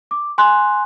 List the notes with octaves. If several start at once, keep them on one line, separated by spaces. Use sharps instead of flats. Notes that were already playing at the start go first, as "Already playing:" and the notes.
D6
G#5 C6 F#6